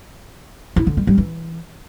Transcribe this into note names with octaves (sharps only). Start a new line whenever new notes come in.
E4
D3
G3
G3
E3